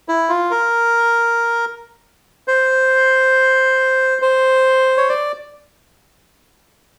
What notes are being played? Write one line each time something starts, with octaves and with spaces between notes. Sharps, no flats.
E4
F4
A#4
C5
C5
C#5
D5